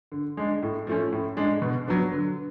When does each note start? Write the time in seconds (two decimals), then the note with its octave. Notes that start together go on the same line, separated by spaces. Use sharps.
0.12 D3
0.37 G#3 D4
0.62 A2
0.87 F3 A3 C#4
1.12 A2
1.37 G#3 D4
1.62 B2
1.87 F#3 B3 D4
2.12 D3